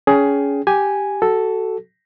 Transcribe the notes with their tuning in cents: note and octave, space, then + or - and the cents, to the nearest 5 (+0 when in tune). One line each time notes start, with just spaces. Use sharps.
C#4 +25 G#4 +15 G5 +5
G4 +0 G#5 +0
F#4 +25 A4 +0